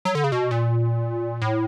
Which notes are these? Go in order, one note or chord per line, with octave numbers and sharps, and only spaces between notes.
F#3
D3
C#3
B2
A#2
A2